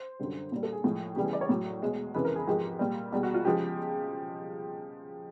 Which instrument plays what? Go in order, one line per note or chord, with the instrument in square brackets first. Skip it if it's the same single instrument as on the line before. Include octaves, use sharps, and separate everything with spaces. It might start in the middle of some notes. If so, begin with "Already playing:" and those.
Already playing: [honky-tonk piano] C5
F#2 D3 G3
A#2 G3
A4
G#4
A2 F3 G#3
E2 C#3 E3 G3 G4
G#4
D5
C#5
A2 F#3
E2 B2 G#3
F2 C#3 E3 G#3 B4
A#4
G#4
G#2 F3 G#3 G4
A#2 G3
E2 B2 G3
F#4
F4
C#3 F3 G#3 G4